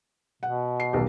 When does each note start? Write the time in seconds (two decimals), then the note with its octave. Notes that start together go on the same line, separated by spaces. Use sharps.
0.43 B2 F#5
0.80 C7
0.93 D#1 B1 G4